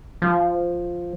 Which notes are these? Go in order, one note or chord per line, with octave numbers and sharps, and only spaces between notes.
F3